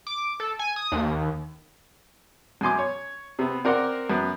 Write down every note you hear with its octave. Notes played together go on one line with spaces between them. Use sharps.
D6
A4
G#5
D#6
D#2
F#2 B2 G#5 C6 D6
C#5
C3 B3
C4 A#4 D5 F#5 C6
F#2 B3